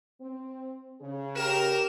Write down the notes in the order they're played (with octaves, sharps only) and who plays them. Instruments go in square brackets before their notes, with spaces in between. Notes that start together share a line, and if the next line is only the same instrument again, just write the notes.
[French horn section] C4
C#3 G#4
[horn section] G4 A#4 [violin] E7